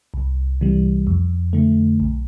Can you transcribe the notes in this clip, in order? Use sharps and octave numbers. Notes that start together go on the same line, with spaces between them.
C2
C3 E3 G3
F2
D3 A3
B1